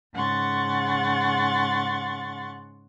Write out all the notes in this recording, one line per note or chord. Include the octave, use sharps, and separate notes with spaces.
G#2 C#3 F#5 C6 C#6 A6